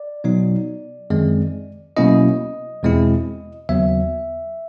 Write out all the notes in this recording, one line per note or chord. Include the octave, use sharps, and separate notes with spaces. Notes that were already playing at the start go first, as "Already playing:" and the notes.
Already playing: D5
B2 F#3 B3 D#4
F#2 D#3 G#3 C4
B2 F#3 A#3 C#4 E4 D#5
E2 B2 G#3 C4 E4
D#2 C#3 F#3 B3 E5